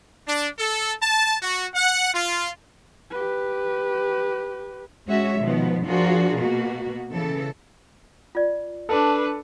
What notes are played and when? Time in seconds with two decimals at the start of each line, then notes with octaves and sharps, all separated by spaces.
0.28 D4
0.58 A4
1.01 A5
1.41 F#4
1.74 F#5
2.14 F4
3.11 G4 B4
5.07 G#3 C#4 F#4 C#5 E5
5.40 B2 D#3 F3 B3
5.85 F3 D4 F4 F#4 G#4 A#4
6.38 B2 A#3 F#4
7.10 C#3 E3 A4
8.35 F4 D5
8.89 D4 A4 B4